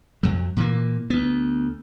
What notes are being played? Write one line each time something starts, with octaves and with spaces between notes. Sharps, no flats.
F2 F#3
A#2 E3 A#3
D2 B3